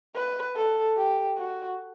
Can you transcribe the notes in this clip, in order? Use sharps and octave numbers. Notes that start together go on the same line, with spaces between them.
B4
A4
G4
F#4